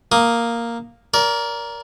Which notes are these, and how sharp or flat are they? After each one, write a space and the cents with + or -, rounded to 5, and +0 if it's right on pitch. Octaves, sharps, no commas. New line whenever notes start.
A#3 +0 D#6 +0
A#4 +10 D5 -30